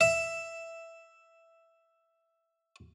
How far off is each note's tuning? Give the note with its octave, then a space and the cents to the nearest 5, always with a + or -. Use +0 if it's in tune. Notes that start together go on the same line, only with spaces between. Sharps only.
E5 +5